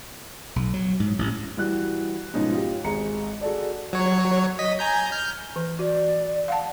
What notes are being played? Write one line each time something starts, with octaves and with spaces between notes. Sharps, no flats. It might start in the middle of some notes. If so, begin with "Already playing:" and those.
B1
F#3
G#2
A1
E3 G3 F#4 F#6
G#2 B2 F3 C#4 D#4
F4 G4
G#1 G#4 A#5 C#7
F#4 G#4 A4 D5
F#3 C#5
D#5 B6
G#5 A#5 G6
F6 G6
E3
F#4 D5
F5 F#5 A5